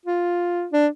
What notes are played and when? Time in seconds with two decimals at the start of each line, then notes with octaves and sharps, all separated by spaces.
0.06 F4
0.72 D4